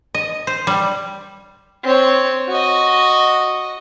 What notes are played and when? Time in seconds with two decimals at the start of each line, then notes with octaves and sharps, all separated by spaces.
0.15 D#5
0.47 C5
0.67 G3
1.84 C4 C#5
2.48 F#4 D#5